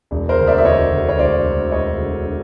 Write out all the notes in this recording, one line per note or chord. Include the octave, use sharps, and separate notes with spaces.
E1
A#4 C5
D2
D5 E5
E5
E1 C#5 D#5
D3
C#5
E1 C5 D5
D2
E1 C#5 D#5
D3